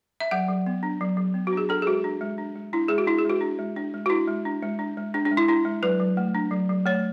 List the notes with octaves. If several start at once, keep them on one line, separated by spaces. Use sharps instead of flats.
E5
F#3 F#5
F#3
B3
D4
F#3
F#3
B3
F#4
D4 G#4
D4 A4
G#4
G#3 F#4
D4
G#3
D4
G#3
D4 E4
G#3 G#4
F#4
D4 E4
G#4
G#3
F#4
D4
G#3
D4
G#3
F#4
D4 E4
G#3
D4
G#3
D4
G#3
D4
D4
G#3
E4
D4 E4
G#3
F#3 B4
F#3
A3
D4
F#3
F#3
A3 C#5